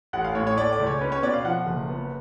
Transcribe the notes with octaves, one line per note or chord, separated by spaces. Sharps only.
A1 F#5
F5
A2 C#5
C#5
A3 D5
D5
C#2
C#5
C#4 B4
C#5
B2 D5
F5
F3 F#5
F#1
B3